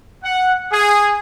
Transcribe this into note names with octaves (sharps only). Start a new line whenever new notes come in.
F#5
G#4